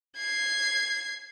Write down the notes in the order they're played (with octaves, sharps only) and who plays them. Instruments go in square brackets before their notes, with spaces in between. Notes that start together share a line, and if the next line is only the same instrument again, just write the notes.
[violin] G#6 C7